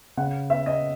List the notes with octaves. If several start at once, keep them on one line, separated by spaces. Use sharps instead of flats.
C#3 F#5
B3 E5
D#5